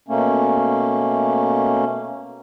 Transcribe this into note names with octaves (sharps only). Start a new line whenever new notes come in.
B2 A3 A#3 C#4